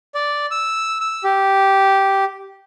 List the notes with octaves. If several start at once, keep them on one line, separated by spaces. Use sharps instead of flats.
D5
E6
E6
G4